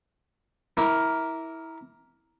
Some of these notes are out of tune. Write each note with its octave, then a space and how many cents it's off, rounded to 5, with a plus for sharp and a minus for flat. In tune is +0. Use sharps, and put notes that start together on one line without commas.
E4 -20 A#4 +5 D6 -20